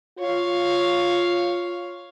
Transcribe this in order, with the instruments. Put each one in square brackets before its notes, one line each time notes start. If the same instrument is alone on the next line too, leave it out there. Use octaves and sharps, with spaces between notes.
[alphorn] F4 [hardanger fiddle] C#5 F5